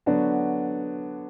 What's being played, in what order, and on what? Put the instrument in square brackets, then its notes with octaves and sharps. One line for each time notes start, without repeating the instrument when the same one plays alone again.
[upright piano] D3 F#3 B3 D4 F#4